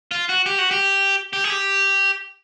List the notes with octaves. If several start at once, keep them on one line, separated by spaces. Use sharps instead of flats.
F4
F#4
G4
F#4
G4
G4
G#4
G4